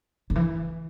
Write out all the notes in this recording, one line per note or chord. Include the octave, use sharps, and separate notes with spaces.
D3
E3